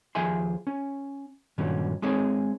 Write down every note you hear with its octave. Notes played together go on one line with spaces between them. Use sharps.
D#2 F3 G#4 E5 G#5 C6
C#4
G2 A#2 D#3 F#3 C#4
G#3 C4 D#4 G#4 C#5